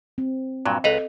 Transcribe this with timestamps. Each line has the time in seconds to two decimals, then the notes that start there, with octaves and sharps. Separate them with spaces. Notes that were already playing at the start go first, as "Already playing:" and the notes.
0.18 C4
0.66 G2 A#2 F#3
0.84 C#2 A4 B4 D#5 A#5